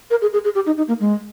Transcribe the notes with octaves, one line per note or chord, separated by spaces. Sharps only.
A#4
G#4
G#4
G#4
G4
D#4
D#4
A#3
G#3